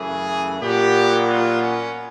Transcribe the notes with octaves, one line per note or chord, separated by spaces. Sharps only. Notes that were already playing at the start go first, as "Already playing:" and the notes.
Already playing: F#2 C#3 E3 A3 G#4
A#2 F#3 B3 G4
F4
C#4